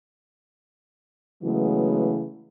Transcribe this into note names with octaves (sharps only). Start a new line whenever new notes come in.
C#3 E3 F#3 G#3 A3 B3